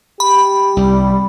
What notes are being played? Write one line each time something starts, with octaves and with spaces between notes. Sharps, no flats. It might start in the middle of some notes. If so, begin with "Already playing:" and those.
G4 B5
C2 G3